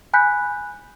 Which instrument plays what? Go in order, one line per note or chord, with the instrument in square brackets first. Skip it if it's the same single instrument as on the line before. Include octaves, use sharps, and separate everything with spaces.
[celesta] G#5 B5 F#6 G6 B6